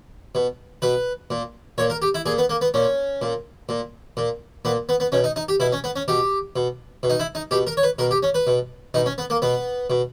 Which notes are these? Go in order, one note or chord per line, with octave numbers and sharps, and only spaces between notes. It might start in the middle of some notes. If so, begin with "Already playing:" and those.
B2
B2 B4
A#2
A#2 C#5
A#4
G4
E4
A#2 G#4
B3
A#3
B3
A#2 C#4
A#2
A#2
A#2
A#2 B3
B3
B3
B2 C#4
D#4
D#4
G4
B2 E4
C#4
B3
C#4
B2 G4
B2
B2
D#4
E4
D#4
B2 G4
A#4
C#5
B4
B2 A#4
G4
C#4
B4
B2
B2 D#4
C#4
B3
A#3
B2 B3
B2